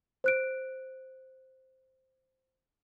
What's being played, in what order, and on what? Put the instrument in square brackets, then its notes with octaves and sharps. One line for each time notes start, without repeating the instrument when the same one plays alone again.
[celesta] C5 F#6 D7